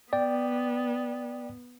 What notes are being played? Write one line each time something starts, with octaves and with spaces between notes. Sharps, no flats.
B3 D5 G5